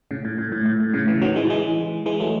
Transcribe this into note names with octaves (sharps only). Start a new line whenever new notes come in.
A2 C#3
A2
A2
A2
A2
A2
A2 C#3
C#3 E3
D#3 F#3
E3 G#3
E3 G#3
E3 G#3
F#3 A3